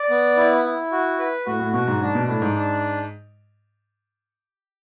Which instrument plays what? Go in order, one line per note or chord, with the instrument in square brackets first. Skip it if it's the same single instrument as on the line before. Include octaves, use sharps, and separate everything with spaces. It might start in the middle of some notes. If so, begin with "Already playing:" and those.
Already playing: [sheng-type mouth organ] D5
B3
E4
E4
F#4
B4
[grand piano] A2 [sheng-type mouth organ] F#4
[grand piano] A2
[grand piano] B2 [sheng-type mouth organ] F#4
[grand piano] G#2
[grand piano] G#2 [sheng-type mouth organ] D4
[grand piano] B2
[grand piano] A2 [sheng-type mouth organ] D4
[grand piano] G#2
[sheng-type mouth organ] D4